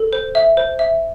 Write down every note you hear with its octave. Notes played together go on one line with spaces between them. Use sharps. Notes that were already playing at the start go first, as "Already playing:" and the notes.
Already playing: A4
C5
E5
C5
E5